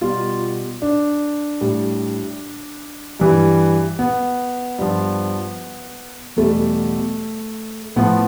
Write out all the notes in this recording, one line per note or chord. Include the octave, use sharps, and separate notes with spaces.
B2 G3 F4
D4
A2 G3
G2 E3 G3
B3
G2 F3
E2 B2 G3 A3
A2 F3 B3